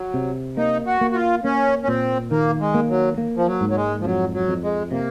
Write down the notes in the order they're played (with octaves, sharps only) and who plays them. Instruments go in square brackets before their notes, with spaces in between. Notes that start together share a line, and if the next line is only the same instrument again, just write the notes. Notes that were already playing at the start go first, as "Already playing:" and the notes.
Already playing: [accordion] F#3
[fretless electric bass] C3
[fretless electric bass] A#3 [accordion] D#4
[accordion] F#4
[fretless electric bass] A#3
[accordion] F#4
F4
[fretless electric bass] A#3 [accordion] C#4
[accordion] C#4
[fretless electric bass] A#2 [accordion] C4
[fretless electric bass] D#3 [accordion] A#3
[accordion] G#3
[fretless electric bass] A#3
[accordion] F#3
[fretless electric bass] A#3
[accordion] F3
F#3
[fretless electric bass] G#2
[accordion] F#3
G#3
F3
[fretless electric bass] F2 [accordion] F#3
[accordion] F#3
[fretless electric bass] F2
[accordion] G#3
[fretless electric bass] C3 [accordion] A#3